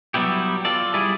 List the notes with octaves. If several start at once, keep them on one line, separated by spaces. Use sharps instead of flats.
F#3 G3 B3 E4 G4
F4 A4 D5
G3 E4 G#4 D5